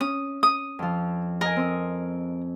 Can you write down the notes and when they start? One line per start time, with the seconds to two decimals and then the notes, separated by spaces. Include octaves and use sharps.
0.01 C#4 D#6
0.43 D#6
0.79 F2 F3
1.41 A#4 D#5 G#5
1.56 C4 D#6